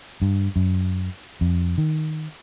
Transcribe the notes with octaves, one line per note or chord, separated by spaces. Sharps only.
G2
F#2
F2
D#3